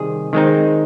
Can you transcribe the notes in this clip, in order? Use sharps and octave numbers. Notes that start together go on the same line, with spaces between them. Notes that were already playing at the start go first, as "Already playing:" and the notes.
Already playing: C3 D#3 G3 G#4
D#3 G#3 C4 D#4